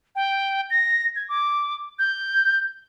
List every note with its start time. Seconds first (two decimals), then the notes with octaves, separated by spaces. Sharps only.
0.16 G5
0.70 A#6
1.16 G#6
1.29 D6
1.99 G6